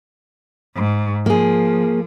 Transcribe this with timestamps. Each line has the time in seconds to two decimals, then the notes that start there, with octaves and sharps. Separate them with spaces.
0.75 G#2
1.26 F3 A#3 G#4